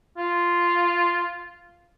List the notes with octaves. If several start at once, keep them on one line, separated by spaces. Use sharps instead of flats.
F4